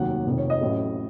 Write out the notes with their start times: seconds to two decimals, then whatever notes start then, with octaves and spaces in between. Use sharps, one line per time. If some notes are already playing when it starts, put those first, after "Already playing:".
Already playing: F1 D#2 D#3 F#3 F#5
0.26 F1 F2 D#3
0.38 C#5
0.50 D#5
0.61 A1 A2 F#3